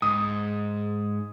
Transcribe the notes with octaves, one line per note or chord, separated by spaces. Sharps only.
G#2 D#6